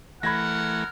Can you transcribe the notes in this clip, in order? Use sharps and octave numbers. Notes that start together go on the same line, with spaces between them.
E3 A3 A#4 F#5 B5 G#6 A#6